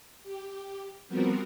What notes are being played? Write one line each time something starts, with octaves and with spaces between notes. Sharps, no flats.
G4
F3 G3 B3 C4 F#4 A#4